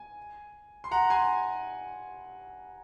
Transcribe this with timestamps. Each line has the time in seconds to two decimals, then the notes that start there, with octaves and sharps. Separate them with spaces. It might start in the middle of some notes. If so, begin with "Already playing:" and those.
Already playing: G#5
0.84 C6
0.91 F#5 A#5
1.10 G#5 C6